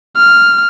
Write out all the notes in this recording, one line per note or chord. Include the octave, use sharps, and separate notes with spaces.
F6